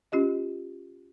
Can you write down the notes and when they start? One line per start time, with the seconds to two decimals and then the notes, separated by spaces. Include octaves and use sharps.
0.12 C#4 F4 G4 D#5